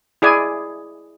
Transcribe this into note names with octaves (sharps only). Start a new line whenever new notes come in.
E4 G#4 D5 G#5